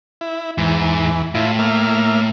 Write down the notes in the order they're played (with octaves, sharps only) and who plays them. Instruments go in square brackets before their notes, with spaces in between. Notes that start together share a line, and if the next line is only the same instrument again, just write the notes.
[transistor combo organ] E4
[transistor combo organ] E2 E3 [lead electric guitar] G#2
[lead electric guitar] A2 [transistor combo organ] E4 F4
[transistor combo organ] A#3 E5 F6